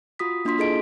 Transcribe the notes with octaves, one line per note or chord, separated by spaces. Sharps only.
F4 F#4 D#6 B6
A#3 D4 F4 C6 B6
E4 G#4 A4 D#5 D7